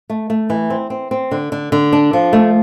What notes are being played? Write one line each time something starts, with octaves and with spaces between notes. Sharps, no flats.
A3
A3
E3
C4
C4
C4
D3
D3
D3
D4
F3
A3